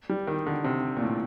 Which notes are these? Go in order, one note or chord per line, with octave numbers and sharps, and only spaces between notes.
G3
D#3
D3
C3
A#2
A2